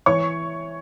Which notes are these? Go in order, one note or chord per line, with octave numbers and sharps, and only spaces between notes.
E3 C#5 C#6